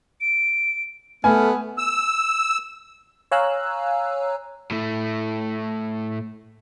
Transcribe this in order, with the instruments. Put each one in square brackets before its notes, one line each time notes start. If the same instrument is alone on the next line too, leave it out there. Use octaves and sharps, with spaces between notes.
[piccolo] D7
[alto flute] A3 [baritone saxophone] B3 [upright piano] G#5 [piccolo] F6
[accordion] E6
[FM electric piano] C#5 F5 G#5 A#5 E6 F#6
[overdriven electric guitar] A2 A3